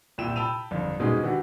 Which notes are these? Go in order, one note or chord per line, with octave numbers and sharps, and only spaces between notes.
C2 A#2 E4 G5 E7
G5 A5 B5 E6 D#7 F7
G1 F2
G#2 B2 G3 G#3 C#4 D#4
E3 D4 F#4 G4